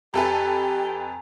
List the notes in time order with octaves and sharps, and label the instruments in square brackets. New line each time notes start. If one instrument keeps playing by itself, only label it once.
[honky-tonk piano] F2 A4 B4 [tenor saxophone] G4 [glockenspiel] G#5 A#5